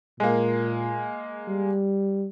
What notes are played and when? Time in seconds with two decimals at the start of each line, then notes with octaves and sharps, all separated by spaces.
0.20 A#2 G#3 A#3
1.48 G3